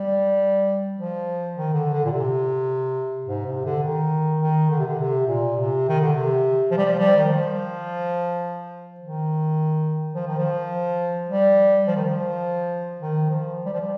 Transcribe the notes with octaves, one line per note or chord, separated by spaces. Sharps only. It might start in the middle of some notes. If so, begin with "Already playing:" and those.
Already playing: G3
F3
D#3
D3
D3
A#2
C3
G#2
C3
D3
D#3
D#3
D3
C3
D3
C3
A#2
C3
D#3
D3
C3
F3
G3
F3
G3
D#3
F3
D#3
F3
D#3
F3
G3
F3
D#3
F3
D#3
F3
G3
F3
G3